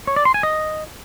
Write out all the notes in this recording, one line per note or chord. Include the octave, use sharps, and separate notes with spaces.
C#5
D5
C6
G#5
D#5